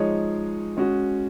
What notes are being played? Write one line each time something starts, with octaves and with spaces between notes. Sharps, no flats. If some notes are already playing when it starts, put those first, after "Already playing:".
Already playing: F3 G#3 D#4 G#4 C#5
G#3 C#4 F#4